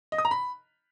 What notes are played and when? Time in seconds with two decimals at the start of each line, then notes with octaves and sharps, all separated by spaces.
0.12 D#5
0.18 D#6
0.25 A#5
0.31 B5